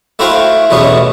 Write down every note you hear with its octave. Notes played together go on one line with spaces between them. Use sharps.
A3 E4 F#4 C5 F5 G5
A1 E2 B2 A3 B3 C#4